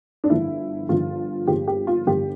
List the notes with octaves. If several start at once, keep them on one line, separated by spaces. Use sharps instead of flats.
D4
G1 G2 D3 F3 E4
G1 G2 D3 F3 F4
G1 G2 F3 G4
G4
F4
G1 G2 F3 G4